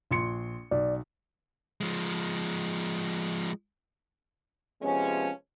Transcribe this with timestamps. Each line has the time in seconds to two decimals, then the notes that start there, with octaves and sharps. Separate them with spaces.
0.11 A#1 C6 C#7
0.71 B1 D5
1.80 F3 G#3
4.81 C3 F3 G#3 B3 C#4